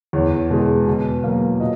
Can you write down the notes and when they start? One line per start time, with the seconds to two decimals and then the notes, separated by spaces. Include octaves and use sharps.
0.13 E2 C#5
0.50 B2 G#3
0.86 B2
1.24 F#3 A#3
1.60 A#2 D#5